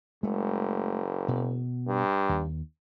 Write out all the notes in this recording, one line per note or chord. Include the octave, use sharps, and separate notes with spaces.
F#1 G#3 A3
B2
G2
D#2